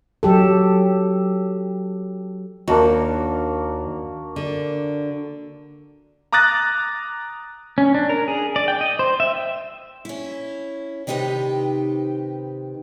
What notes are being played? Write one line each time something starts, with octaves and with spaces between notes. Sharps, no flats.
F#3 G4 A4
D#2 A#3 D4 F#4
D3
A#5 D6 D#6 F#6 A6 A#6
C#4
D4
A#4
G#4
D5
G5
D#5
C5
E5
G5
C#4 E4
C3 D#3 D#4 G4 B4